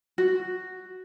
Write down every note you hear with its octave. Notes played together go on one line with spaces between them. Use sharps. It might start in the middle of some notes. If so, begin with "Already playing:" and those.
F#4